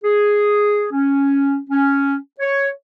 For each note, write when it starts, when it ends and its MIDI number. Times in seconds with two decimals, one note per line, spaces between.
0.04 0.86 68
0.92 1.57 61
1.69 2.16 61
2.40 2.68 73